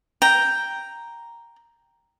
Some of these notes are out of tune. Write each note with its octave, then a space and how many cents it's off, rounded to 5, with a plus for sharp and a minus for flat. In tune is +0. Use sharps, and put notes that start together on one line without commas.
G5 +0 A#5 +0